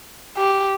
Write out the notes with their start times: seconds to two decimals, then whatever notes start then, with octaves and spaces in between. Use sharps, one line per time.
0.37 G4